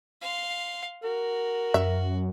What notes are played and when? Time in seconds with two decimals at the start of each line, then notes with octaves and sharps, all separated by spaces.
0.21 F5 C6
1.04 F#4 A#4
1.74 F#2 E5